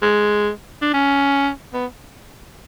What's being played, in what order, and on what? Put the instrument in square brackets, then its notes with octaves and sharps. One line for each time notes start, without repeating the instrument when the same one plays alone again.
[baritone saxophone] G#3
D4
C#4
B3